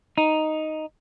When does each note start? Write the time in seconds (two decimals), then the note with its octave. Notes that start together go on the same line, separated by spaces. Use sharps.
0.18 D#4